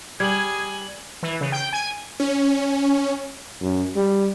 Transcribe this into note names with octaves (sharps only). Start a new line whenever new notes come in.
G3 G#4 G#5 G#6 F#7
E3
C#3
G5
G#5
C#4
F#2
G3